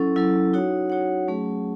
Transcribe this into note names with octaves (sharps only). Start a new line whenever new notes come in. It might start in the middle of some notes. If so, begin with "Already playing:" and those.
Already playing: F#3 C#4 E4 A4
F#3 C#4 E4 A4
D#4 F#4 C#5 F#5
D#4 F#4 C#5 F#5
F#3 A3 C#4 G#4